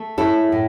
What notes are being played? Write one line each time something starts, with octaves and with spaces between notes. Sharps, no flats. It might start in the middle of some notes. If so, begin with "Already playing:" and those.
Already playing: A3
C#4 E4 A4
A2